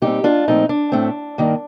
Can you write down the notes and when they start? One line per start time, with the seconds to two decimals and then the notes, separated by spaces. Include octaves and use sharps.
0.02 A#2 G3 C4 D#4 G4
0.24 D4 F4
0.48 A#2 F3 A3 C4 D#4
0.69 D4
0.92 A2 A3 C4
1.38 G2 D#3 A#3